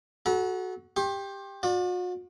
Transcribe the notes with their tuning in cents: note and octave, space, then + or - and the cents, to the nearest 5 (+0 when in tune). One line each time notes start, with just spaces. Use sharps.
F#4 +0 A4 -35 A#5 +45
G4 +10 C6 +40
F#4 -45 D5 +15